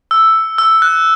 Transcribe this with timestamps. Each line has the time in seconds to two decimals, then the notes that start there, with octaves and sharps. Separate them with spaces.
0.11 E6
0.58 E6
0.82 F#6